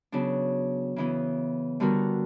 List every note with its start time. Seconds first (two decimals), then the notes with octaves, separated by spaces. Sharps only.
0.12 C#3 F#3 B3 D4
0.96 C#3 E3 B3
1.80 D3 G3 B3 F#4 A#4